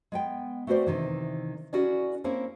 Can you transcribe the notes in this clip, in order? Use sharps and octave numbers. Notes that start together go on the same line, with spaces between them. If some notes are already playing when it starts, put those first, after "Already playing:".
G#3 B3 G5
A3 C4 F#4 B4 C5 D5
C3 D#3 E3
C#4 E4 F#4 G#4 A#4 D5
A#3 C4 C#4 E4 A#4